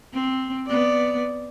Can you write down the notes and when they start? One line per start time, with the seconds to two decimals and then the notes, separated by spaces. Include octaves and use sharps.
0.13 C4
0.66 B3 D5